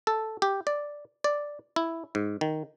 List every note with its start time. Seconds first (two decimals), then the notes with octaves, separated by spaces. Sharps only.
0.07 A4
0.42 G4
0.67 D5
1.24 D5
1.76 E4
2.15 G#2
2.41 D#3